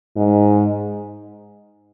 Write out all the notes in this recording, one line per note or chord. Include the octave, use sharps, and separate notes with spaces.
G#2